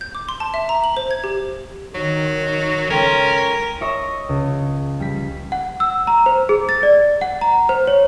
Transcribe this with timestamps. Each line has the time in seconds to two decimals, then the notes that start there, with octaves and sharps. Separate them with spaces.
0.01 G6
0.15 D6
0.29 C6
0.40 A5
0.54 E5
0.69 A#5
0.84 F#7
0.97 C5
1.11 G#6
1.24 G4
1.95 D#3 F#3
2.90 C#2 C#4 A4 A#4 G5 C6
3.81 C#5 D#5 E5 C#6 A#6
4.29 C#2
5.00 G3 B6
5.52 F#5
5.80 E6
6.07 A#5
6.26 C5
6.49 G#4
6.69 A6
6.83 D5
7.21 F#5
7.41 A#5
7.69 C5
7.87 C#5